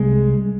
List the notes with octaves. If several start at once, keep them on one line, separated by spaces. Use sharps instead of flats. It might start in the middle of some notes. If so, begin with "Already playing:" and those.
Already playing: C2 C3 G3 G#3